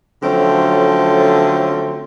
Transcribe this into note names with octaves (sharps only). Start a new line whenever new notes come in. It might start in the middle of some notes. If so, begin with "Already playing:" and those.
D3 F3 F#3 A3 C4 C#4